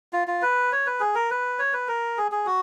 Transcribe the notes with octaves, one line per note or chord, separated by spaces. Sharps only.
F4
F4
B4
C#5
B4
G#4
A#4
B4
C#5
B4
A#4
G#4
G#4
F#4